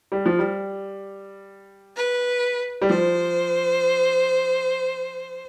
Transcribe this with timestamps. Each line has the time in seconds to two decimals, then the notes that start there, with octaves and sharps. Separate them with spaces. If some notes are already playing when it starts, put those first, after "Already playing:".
0.12 G3
0.26 F3
0.39 G3
1.96 B4
2.82 G3
2.89 F3 C5